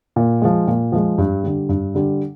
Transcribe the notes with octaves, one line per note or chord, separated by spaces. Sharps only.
A#2
F3 G#3
A#2
F3 G#3
G2
D3 G3
G2
D3 G3